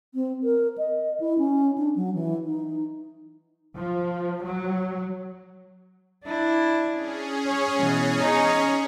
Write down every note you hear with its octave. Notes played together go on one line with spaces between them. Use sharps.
C4
A#4
D#5
E4
C#4
D4
F#3
E3
D#4
F3
F#3
D4 E4
C#4 G#4
C#5
B2 E3
D#4 C#5